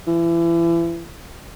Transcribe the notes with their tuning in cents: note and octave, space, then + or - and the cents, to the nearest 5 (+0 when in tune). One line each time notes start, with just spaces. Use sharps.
E3 +35